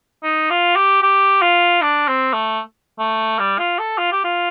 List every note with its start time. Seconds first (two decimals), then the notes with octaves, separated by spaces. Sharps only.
0.23 D#4
0.50 F4
0.76 G4
1.02 G4
1.42 F4
1.81 D4
2.08 C4
2.33 A3
2.99 A3
3.39 G3
3.59 F4
3.79 A4
3.98 F4
4.12 G4
4.24 F4